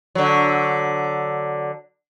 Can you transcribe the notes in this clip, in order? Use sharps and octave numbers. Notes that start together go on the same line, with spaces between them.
D3 F#3